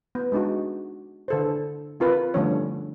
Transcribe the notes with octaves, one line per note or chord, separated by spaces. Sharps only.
B3
G#3 D4 D#4 F#4
D3 A4 C5
C4 F4 A#4 B4
D3 F3 G3 A3 C#4 C#5